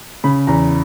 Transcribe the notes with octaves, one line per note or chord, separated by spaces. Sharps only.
C#3 B5
E2 A#5